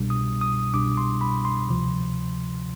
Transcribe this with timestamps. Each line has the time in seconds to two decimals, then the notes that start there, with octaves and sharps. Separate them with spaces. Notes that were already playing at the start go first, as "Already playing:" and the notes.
Already playing: C2 B2 G3 D4
0.10 D#6
0.41 D#6
0.73 C2 B2 G3 D4 D6
0.97 C6
1.21 B5
1.45 C6
1.69 D2 C3 F3